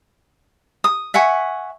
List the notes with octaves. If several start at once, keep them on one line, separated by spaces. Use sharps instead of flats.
D#6
E5 F#5 G#5 C#6